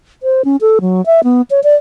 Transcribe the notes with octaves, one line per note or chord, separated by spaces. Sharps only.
C5
C#4
A4
F#3
E5
B3
C#5
D5